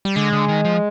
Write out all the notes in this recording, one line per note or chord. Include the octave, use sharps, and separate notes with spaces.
G3
D3 G#3
D3
D#3
F3